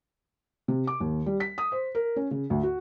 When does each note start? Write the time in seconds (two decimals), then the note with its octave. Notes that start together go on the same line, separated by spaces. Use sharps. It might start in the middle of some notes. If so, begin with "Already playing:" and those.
0.68 C3
0.87 D6
1.00 D#2
1.26 G3
1.40 B6
1.58 D#6
1.72 C5
1.95 A#4
2.16 C#4
2.31 C#3
2.50 D2
2.63 F#4